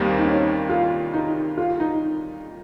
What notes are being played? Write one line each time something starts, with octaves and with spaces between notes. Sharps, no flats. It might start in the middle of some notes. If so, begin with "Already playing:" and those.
Already playing: D#2 D#3 G3 A#3 C4
D#4
C#4
F4
D#4
F4
D#4